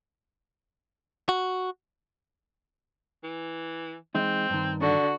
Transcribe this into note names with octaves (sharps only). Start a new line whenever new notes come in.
F#4
E3
E3 G#3 C4 D#4
G2 D#3
D3 F#4